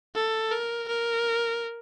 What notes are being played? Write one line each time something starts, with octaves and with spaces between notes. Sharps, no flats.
A4
A#4
A#4